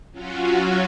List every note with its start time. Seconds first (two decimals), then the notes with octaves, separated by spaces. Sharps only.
0.12 F#3 C#4 F4 F#4